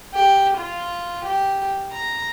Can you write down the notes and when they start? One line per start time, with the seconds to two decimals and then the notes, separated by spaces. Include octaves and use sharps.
0.15 G4
0.58 F4
1.25 G4
1.92 A#5